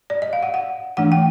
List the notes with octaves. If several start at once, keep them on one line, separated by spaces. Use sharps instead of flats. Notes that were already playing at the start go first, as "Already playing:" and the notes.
D5
D#5
F5
F#5
F#5
E3 A3 D4 F#5
G5